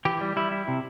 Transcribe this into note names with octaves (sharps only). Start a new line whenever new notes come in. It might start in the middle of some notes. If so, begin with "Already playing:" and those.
E3 G4
G3
G3 E4
E4
C3